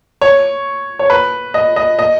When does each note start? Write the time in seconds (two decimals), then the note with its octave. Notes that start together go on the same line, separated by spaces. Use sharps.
0.21 C#5
0.99 C#5
1.10 B4
1.54 D#5
1.76 D#5
1.99 D#5